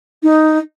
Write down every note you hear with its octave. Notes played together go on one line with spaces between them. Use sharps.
D#4